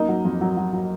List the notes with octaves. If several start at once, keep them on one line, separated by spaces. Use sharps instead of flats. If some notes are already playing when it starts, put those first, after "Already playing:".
Already playing: F#2 A#3 D#4
F#3
F2
F#3
F#3
F#3